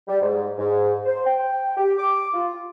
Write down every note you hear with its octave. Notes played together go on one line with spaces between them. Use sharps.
G3
G#2
G#2
C5
G5
G4
D6
F4